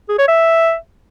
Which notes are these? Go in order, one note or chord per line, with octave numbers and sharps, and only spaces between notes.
G#4
C#5
E5